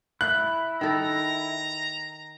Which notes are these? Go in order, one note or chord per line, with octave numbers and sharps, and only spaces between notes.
E4 F#6
D#3 A4 A#5